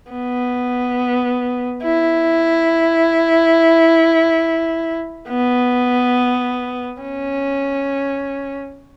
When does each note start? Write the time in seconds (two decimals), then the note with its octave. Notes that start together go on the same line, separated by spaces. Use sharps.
0.12 B3
1.84 E4
5.29 B3
7.02 C#4